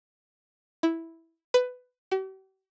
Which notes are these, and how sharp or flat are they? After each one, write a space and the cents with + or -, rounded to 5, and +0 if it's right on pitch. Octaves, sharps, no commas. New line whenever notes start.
E4 -5
B4 +15
G4 -45